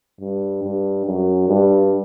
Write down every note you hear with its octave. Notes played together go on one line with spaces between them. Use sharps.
G2
G2
F#2
G2